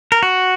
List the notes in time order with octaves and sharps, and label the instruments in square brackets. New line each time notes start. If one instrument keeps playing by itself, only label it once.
[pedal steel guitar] A#4
F#4